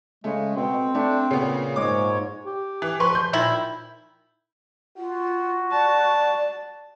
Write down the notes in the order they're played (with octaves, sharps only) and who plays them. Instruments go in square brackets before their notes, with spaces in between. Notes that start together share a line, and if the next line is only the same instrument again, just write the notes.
[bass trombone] C#3 [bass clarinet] G#3 [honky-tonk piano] A3
[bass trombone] B2 [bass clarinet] C4
[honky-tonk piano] A3 [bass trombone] D4
[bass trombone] A#2 [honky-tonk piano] C#3 B3
[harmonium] G#2 C#5 [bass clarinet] G#3 [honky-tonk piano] D6
[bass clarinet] G4
[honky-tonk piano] E3
[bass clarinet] F3 [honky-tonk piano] B4 C6 C#6
[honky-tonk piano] C6 G6
[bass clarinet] A#2 [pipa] D#3 E4 B5
[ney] F4 [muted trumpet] F#4
[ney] D5 [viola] A5